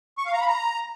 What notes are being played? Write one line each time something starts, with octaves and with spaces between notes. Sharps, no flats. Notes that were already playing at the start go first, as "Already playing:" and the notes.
C#6
F5
A#5
B5
A#5